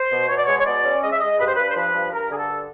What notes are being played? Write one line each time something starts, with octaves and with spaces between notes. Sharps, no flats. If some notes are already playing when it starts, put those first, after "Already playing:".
Already playing: C5
B2
B2 C#5
D5
G#3 C#5
C#5
B2 D5
C#4
G#3 D#5
E5
G#3 D#5
G2 B4
C5
G2 B4
C5
F3 B4
G2
G2 A#4
D3 G#4
A4
G2